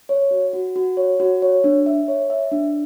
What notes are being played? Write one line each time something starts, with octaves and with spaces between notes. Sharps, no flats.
C#5
F#4
F#4
F#4
C#5
F#4
C#5
D4
E5
C#5
E5
D4